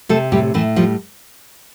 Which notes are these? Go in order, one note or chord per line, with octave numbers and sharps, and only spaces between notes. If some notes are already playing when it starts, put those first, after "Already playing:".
C3 A3 A4
A2 G3 G4
A2 E3 E4
F3 G3 F4